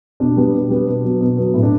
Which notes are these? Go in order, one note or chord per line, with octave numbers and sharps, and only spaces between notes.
B2 D4
G3 B3
B2
G3 B3
B2
F#3 B3
B2
F#3 B3
A2
D4